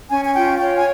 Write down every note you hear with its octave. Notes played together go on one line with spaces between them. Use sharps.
C#4 G#5
G#5
F4 G5
C#5 G5
G#5